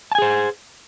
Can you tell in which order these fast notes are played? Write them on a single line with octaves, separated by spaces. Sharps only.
A5 G#5 G#4 C5